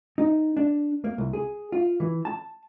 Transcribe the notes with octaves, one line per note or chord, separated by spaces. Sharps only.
D#4
D4
A#3
C2
G#4
F4
E3
A5